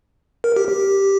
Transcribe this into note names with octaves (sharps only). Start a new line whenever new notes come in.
A#4
G4
G4